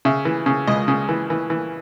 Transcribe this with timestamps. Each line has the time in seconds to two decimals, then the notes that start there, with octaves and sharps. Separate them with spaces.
0.05 C#3 E5
0.25 E3
0.46 C#3
0.67 C#2 D#5
0.88 C#3
1.09 E3
1.30 E3
1.50 E3